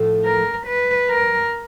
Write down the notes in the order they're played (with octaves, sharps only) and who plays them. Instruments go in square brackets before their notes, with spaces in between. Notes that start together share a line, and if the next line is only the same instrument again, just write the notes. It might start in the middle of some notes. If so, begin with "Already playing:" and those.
Already playing: [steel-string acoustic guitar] A2 F3 A3
[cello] A#4
B4
A#4